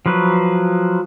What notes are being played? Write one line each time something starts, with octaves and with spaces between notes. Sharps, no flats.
F3 F#3 B4